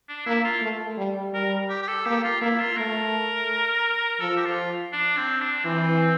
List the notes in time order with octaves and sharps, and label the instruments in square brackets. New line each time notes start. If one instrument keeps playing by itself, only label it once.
[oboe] D4
[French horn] A#3 [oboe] E4
[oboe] F4
[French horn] A3
G3
[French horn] G3 [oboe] A#4
[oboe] G4
G4
A4
[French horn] A#3 [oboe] G4
[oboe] F4
[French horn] A#3 [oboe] E4
[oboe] F4
[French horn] A3 [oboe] A#4
[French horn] F3 [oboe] A4
[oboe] G4
F4
D4
C4
D4
[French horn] E3 [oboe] C4